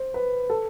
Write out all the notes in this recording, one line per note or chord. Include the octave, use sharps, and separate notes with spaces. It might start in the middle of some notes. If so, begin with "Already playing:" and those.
Already playing: C5
B4
A4